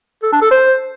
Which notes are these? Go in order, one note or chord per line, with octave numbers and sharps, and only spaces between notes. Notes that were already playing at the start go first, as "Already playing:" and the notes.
A4
D4
A4
C5